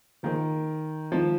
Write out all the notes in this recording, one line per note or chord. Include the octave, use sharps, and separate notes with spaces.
D#3 F3 A#3 G#4 C5
D#3 F3 G#3 C4 D#4